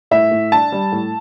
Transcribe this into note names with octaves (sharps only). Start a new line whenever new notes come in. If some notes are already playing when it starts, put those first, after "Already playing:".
A2 E5
A2
D4 A5
G3
A2